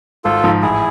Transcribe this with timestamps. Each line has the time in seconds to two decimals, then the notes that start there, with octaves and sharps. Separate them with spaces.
0.24 G#1 F4 A4
0.44 G#2 F3
0.62 A1 E4 G#4